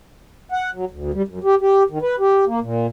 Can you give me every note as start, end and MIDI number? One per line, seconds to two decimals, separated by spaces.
0.52 0.71 78
0.74 0.85 54
0.91 1.11 38
1.14 1.22 55
1.28 1.39 42
1.44 1.55 67
1.61 1.83 67
1.90 1.98 51
2.02 2.16 71
2.19 2.45 67
2.47 2.60 58
2.61 2.87 46